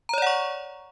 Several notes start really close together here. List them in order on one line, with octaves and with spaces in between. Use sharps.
A#5 C#5 D5 F#5 C#6